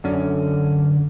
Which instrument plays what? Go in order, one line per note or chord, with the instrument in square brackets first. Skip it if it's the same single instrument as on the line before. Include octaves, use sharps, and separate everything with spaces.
[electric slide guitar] F#2 C#4 [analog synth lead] D3